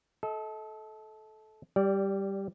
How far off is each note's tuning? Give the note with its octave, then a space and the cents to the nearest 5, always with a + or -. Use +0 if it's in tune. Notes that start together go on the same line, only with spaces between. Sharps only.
A4 -20 D#5 +40
G3 +0 D5 -20